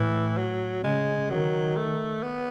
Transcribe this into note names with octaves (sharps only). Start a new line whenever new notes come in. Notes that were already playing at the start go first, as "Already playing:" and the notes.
Already playing: A2 E3
F#3
C#3 G#3
D#3 F#3
A3
B3